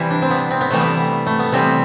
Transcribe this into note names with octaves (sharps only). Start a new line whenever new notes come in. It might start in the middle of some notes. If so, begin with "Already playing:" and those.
Already playing: C3 E3 G3 E4
D4
C4
B3
C4
B3
C3 E3 G3 A3
B3
A3
B3
C3 E3 G3 C4